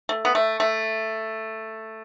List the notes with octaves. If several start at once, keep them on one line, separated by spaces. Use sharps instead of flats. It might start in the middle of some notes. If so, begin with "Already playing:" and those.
A3
B3
A3
A3